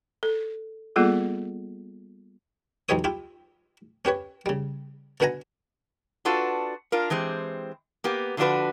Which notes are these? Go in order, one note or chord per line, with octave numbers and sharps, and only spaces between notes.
A4
G3 A#3 B3 F4 G#4 A4
B1 E2 G#3 G4 C#5 D#6
E4 F4 G4
C#4 G4 B4 C#5
C#3 G3
B2 D3 B4 F#5 G#5 A#5
D4 F4 F#4 A4 B4
D4 F4 A#4
E3 G#3 C4 G4
A#3 B3 G4
D3 F3 A3 D4 F#4 B4